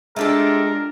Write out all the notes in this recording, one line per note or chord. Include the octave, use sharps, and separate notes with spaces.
G#3 A3 D4 F4 G4 A4 A#4